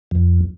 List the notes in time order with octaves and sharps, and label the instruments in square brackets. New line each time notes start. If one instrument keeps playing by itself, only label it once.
[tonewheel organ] F2